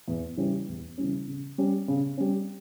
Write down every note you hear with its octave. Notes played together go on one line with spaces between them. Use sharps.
E2
C#3 E3 G3 C#4
E2
C#3 E3 G3 C#4
C#3
G3 C#4
C#3
G3 C#4